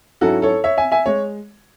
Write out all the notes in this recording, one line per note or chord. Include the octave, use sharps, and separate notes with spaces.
G#2 F#3 C#4 E4 F#4 A4
A4 C#5
C#5 E5
E5 G#5
E5 G#5
G#3 C#5